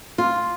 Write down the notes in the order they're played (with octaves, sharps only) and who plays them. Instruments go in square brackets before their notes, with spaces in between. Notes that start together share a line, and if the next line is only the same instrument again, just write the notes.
[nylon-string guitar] F4